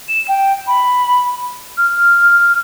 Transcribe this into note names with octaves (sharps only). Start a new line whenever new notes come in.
E7
G5
B5
F6